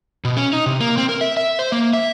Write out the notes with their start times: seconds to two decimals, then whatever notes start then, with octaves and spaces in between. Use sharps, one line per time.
0.25 B2
0.37 C#4
0.53 D#4
0.66 C3
0.81 A#3
0.97 C4
1.09 A#4
1.21 E5
1.37 E5
1.59 C5
1.72 A#3
1.93 E5